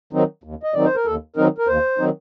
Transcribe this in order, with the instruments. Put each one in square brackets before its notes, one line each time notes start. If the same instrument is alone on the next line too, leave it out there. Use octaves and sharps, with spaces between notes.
[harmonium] D#3 F#3 C4 D#4
D#2
D#5
D#3 F#3 C4 D#4 D5
C5
A#4
D#2 A4
D#3 F#3 C4 D#4 A#4
A#4
D#2 C5
D#3 F#3 C4 D#4